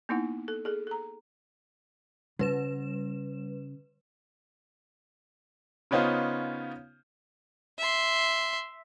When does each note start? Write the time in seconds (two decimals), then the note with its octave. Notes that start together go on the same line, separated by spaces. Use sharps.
0.09 A#3 B3 D#4 E4 F#5
0.48 A4
0.65 G#4 A4
0.87 A4 A#5
2.39 C#3 G3 B4 E7
5.91 C#3 B3 C#4 D#4 F4 C5
7.78 E5 C6